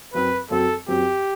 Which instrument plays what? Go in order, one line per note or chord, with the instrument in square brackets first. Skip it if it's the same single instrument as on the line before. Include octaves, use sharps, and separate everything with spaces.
[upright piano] F#2 F#3 C4 [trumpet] B4
[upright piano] F#2 F#3 C4 [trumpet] A4
[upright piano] F#2 F#3 C4 [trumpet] G4